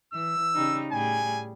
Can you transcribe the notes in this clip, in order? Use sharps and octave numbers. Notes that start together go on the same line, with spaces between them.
E3 E6
C#3 G3 D#4
A2 G3 G#4 G#5